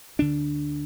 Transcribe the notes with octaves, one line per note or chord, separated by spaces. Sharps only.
D2 D3 D4